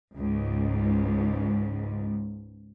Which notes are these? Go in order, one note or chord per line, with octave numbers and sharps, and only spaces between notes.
C#2 G#2